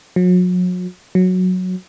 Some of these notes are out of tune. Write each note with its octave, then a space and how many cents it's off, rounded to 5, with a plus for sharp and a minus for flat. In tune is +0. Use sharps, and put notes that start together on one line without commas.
F#3 -40
F#3 -10